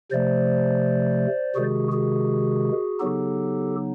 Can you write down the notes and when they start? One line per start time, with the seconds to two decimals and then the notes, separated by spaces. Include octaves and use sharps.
0.11 C3 F3 A3 C5 D5
1.55 C3 D#3 G#3 F#4 G#4
1.92 F#4 G#4
3.00 C#3 F#3 B3 D#4 G4 A4